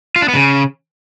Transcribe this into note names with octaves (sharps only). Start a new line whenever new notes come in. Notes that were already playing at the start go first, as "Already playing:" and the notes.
F4
D4
B3
C#3